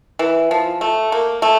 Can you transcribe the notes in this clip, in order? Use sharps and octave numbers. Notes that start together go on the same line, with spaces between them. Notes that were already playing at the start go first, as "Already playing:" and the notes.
E3
F3
A3
A#3
A3